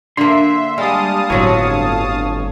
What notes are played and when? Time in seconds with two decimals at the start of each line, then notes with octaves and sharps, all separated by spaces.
0.17 D3 A#3 E5 C6
0.78 G3 G#3 F5 A5 D#6
1.30 G1 A2 F#3 C4 C#5